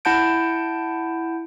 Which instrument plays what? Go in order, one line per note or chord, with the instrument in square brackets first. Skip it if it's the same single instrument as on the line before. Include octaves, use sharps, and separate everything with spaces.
[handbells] E4 F#5 A5 G6 D7